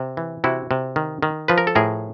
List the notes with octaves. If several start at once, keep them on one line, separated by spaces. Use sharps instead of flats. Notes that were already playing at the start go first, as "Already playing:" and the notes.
Already playing: C3
E3
C3 E4 F#4
C3
D#3
D#3
F3 B4
A#4
A4
A2 G#4 A#4